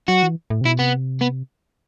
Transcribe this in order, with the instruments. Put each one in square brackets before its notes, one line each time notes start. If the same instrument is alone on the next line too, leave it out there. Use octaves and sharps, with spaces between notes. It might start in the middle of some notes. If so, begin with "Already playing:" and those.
[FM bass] F#3 [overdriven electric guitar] F#4
[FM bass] E3
A2
C3
[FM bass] B2 [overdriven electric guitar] E4
[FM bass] C3 [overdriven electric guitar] B3
[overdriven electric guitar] B3